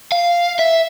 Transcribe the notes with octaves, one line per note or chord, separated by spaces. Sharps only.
F5
E5